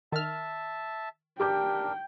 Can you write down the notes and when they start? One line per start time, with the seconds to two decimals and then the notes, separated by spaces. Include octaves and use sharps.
0.12 D#3 E5 A5 F6
1.40 D4 G4 A#4 G5 D6 G6